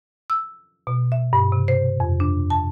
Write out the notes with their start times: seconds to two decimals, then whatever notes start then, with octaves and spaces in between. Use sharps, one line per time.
0.30 E6
0.87 B2
1.12 E5
1.33 G2
1.52 C3
1.68 C5
2.00 F2
2.20 D4
2.50 A5